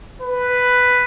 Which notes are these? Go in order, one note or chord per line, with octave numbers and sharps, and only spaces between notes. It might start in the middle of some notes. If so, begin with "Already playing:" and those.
B4